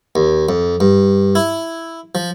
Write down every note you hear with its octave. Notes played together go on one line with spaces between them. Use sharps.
D#2
F2
G2
E4
F3